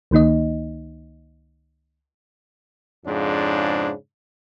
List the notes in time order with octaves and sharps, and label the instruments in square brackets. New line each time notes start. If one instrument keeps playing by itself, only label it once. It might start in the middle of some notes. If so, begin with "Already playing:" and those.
[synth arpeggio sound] C#2 D#3 A#3 D#4 D#5
[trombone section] F2 G#2 C#3 D4